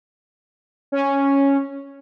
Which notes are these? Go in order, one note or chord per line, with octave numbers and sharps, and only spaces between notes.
C#4